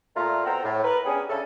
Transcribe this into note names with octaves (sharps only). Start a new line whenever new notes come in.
A#2 A3 F4 A#5
B2 C4 A4 F#5 G5 A#5
A2
A#4 B4
B3 C#4 D4 G4 G#4
C#3 C#4 D4 E4 A4